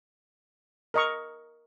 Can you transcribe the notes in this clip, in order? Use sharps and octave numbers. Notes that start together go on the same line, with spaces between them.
A#4 D#5 A#5 C#6